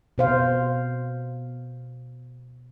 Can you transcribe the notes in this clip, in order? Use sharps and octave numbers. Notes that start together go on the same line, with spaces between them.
B2 C5 F5